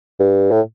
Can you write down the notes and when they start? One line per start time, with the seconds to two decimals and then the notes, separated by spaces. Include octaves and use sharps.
0.20 G2
0.51 A2